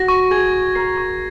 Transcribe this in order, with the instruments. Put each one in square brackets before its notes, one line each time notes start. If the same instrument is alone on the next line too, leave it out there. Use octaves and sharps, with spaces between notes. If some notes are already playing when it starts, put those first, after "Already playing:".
Already playing: [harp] F#4 [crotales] A#6
[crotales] C#6
[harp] G#4 [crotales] G#6
[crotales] C#6
[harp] A#4 [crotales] C7
[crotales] C#6